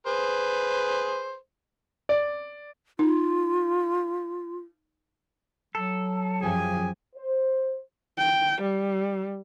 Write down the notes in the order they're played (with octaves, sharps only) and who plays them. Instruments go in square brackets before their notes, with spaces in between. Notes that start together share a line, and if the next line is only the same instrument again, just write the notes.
[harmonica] G#4 B4 C5
[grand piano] D5
[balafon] D#4 [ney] F4
[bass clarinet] F#3 [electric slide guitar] A4
[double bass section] F#2 F3 [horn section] G4 G#4 G#5
[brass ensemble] C5
[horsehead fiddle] G5
G3